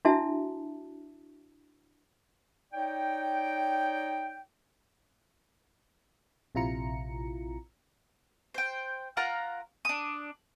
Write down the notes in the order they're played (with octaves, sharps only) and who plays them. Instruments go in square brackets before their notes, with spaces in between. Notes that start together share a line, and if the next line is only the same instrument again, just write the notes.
[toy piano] D4 E4 F#4 E5 A5
[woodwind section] D#4 C#5 D5 G5
[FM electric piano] A#1 C3 E4 F4 A#5 C#7
[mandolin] C5 G5
F4 A#4 F#5 A#5
D4 D#6